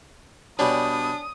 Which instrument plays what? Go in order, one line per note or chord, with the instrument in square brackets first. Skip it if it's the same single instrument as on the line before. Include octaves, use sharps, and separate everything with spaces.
[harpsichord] B2 G3 [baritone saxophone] D4 [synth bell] C#5 D5 G#5 [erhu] D#6